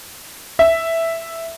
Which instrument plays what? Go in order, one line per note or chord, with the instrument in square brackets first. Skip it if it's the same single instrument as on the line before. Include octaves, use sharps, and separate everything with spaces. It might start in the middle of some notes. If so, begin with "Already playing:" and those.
[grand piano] E5